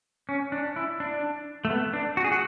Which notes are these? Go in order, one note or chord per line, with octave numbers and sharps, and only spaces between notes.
C#4
D4
E4
D4
A3
B3
D4
F#4
G#4
F#4